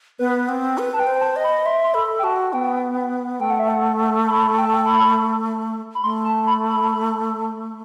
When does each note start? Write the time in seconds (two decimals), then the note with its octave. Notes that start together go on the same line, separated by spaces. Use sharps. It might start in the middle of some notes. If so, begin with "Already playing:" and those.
0.19 B3 B4
0.49 C4
0.78 B4
0.93 A5
0.99 G5
1.07 C5
1.15 G5
1.22 A5
1.36 D#5
1.44 B5
1.66 E5 C6
1.83 C6
1.94 A4 B5
2.19 G5
2.23 F#4 A5
2.53 B3 G5
3.40 A3 G5
3.50 F#5
3.59 E5
3.69 F#5
4.28 B5
4.58 G5
4.65 A5
4.74 G5
4.86 B5
5.95 B5
6.03 A3 C6
6.25 A5
6.47 B5
6.69 B5